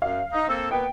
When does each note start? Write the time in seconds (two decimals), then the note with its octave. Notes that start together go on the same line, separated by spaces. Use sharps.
0.02 F#2 F5
0.33 D#4
0.48 A#3 C4 A4
0.71 A#2 B3 G5